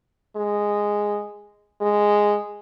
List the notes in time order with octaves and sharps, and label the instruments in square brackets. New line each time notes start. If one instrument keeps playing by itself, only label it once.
[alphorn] G#3
G#3